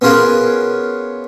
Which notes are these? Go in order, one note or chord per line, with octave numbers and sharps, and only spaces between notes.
B3 C#4 F4 F#4 G#4 A#4